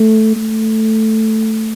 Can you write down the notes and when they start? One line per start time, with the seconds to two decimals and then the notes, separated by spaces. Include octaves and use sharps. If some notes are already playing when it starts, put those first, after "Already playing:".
Already playing: A3
0.36 A3